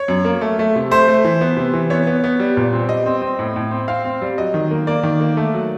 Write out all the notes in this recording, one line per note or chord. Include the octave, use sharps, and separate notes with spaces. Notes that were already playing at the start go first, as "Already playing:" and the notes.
Already playing: C#5
F#2
A#3
A3
A3
C3
A3 C5
A3
E3
B3
C3
E3
B3 C#5
B3
B3
G3
A#2
C4
G3 D#5
C4
C4
A2
A2
C4
C4 F5
C4
G3
F#3 D#5
D#3
A#3
A#3 D5
D#3
A#3
A3
F#3